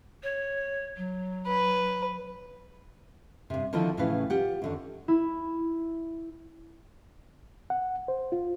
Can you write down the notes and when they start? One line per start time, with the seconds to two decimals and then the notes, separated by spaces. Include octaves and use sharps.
0.23 C#5
0.97 F#3
1.46 B4
3.50 G2 C3
3.73 D3 D#3 F3 C4 E4 F4
3.97 A2 C#3 E3 B4 F5
4.30 F4 G4 F#5
4.62 F#2 D3 D#3
5.08 E4
7.70 F#5
8.08 C5
8.32 F4